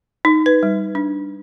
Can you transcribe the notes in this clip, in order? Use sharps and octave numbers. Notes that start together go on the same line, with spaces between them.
D#4
B4
G3
D4